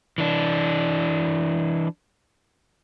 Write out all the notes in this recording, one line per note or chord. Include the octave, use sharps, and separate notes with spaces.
E3 D4